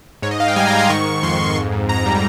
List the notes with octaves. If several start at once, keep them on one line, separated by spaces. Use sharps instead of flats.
G#2 C#5
D#5
G#2 F5
G5
G3 G#5
A#5
G#2
C6
D#3 C#6
D#3
F2 C6
F2
G#2
G#2
G#2 A#5
G3